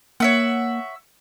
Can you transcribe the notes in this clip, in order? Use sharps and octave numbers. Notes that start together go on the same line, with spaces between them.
A#3 C#5 E5 F#5